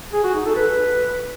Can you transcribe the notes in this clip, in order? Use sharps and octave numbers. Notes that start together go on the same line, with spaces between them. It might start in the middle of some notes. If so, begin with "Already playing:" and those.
G#4
F#4
D#4
A4
B4